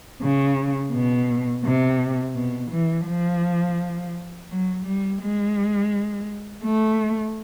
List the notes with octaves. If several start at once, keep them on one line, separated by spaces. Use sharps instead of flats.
C#3
B2
C3
B2
E3
F3
F#3
G3
G#3
A3